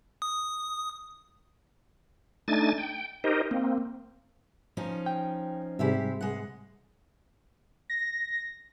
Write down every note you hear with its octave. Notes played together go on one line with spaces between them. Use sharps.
D#6
A3 D4 D#4 G#5 A6
G5
D#4 G4 A#4 C5 D#5
A#3 C4
F3 C#4 D#4
G5
G#2 C3 G3 G#3 G4 E5
G#3 F#5
A#6